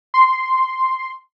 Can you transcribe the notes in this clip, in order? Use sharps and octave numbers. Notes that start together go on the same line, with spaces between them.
C6